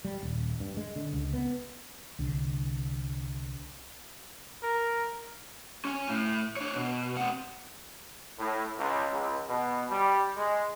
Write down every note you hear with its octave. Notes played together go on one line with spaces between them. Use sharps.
G3
D#1
G2
G#3
D3
C#2
B3
C2 D3
A#4
C#4 G#5
A2
D4 C#5
B2
C4 F#5
A2
C#2
C#2
B2
G3
G#3